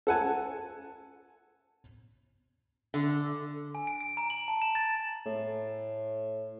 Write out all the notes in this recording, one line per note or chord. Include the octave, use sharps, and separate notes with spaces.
A4 F#5 G#5 A5
D3
G#5
D7
D7
A#5
F#7
A5
E7
A6
A2